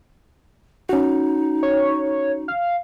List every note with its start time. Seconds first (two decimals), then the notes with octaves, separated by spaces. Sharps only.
0.89 C#4 D#4 F#4
1.63 C#5
2.48 F5